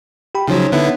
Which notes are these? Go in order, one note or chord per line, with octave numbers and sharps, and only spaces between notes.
G4 G5 B5
C#3 F3 F#3 D#4 C#5
D3 B3 E4